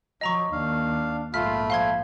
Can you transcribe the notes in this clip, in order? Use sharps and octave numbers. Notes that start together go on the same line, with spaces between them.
F3 F#3 D#5 A#5 C#6
D#2 D4 F5
A#1 G#2 A3 F4 B5 F6 B6
F3 F5 C6 G#6